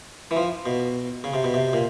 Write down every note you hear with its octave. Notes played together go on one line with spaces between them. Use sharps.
E3
F3
B2
C#3
C3
B2
C3
A#2